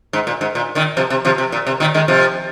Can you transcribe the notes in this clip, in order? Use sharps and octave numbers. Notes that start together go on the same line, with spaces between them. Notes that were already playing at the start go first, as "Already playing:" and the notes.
G#2
A#2
G#2
A#2
A#2 D#3
C3 F3
C3
C3 F3
C3
A#2
C3
A#2 D#3
D#3 G#3
C3 F3